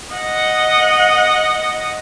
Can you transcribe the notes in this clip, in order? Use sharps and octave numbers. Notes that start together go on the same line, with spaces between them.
D#5 F#5